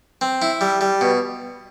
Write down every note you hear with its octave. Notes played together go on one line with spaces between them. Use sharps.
C4
E4
G3
G3
B2